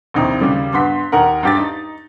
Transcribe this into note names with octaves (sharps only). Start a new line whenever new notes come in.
A#1 D#2 C3 D#4 E4
D#2 C#3 G3
G2 B3 C6 B6
D#2 D#4 A#4 F#5
G2 G4 A6
D#4